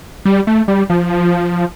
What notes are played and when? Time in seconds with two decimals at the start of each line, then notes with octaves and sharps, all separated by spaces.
0.25 G3
0.47 A3
0.68 G3
0.90 F3